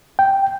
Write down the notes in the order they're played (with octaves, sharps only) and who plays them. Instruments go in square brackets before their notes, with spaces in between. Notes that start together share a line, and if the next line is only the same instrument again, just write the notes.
[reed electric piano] G5